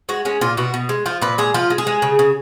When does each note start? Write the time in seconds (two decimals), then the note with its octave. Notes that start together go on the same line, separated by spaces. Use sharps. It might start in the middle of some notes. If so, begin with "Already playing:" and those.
0.09 G#3 F#4
0.25 G#3 C#4
0.41 A#2 F4
0.57 B2 F#4
0.74 B2
0.89 G#3
1.06 F3 F4
1.22 A#2 B4
1.38 G#3 G#4
1.54 F3 F4
1.70 G#3
1.78 G#4
1.87 G#3
2.02 C#3
2.19 C#3